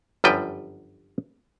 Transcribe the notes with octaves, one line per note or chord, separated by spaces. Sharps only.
G1 F#2 F3 G3 B4 G5